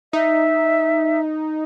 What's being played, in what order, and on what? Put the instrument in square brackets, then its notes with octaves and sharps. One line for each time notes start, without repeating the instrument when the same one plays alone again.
[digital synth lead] D#4 [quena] E5